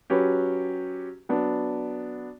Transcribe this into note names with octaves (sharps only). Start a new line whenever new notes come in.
F#3 C#4 G4 B4
F#3 B3 D4